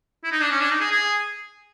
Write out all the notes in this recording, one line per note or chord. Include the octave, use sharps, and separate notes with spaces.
E4
D#4
D4
C#4
D4
D#4
G#4
G#4